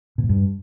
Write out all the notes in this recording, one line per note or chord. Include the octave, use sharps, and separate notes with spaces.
B2
A2
G2